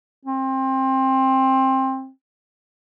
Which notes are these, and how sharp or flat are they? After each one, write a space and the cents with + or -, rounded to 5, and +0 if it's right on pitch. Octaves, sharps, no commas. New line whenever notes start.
C4 +20